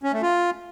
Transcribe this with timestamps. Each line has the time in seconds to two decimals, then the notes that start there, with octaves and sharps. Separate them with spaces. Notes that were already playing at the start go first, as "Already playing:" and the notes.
0.03 C#4
0.13 A3
0.22 F4